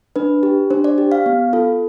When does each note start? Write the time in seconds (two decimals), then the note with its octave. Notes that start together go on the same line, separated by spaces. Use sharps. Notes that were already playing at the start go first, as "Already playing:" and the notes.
0.16 D4 B4
0.43 G4
0.70 D4 C5
0.84 D5
0.98 G4
1.12 F5
1.26 B3
1.53 F4 A4